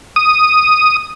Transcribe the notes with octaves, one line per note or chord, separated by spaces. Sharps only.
D#6